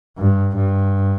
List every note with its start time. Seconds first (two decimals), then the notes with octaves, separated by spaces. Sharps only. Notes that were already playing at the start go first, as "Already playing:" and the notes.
0.18 G2
0.56 G2